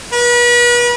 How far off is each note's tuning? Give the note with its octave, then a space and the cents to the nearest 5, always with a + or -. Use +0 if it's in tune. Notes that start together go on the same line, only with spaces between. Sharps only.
B4 -35